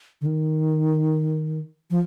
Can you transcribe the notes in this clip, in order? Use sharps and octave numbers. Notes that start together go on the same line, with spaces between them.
D3
D#3
F3